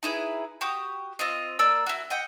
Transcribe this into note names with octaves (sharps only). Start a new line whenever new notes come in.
D#4 E4 G#4 B4
F#4 G4 D#6
C4 F4 D#5
A#3 A#4 D5 E6
E4 F#4
D#5 F#5 G5